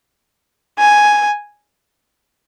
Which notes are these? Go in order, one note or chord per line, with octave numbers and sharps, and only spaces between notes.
G#5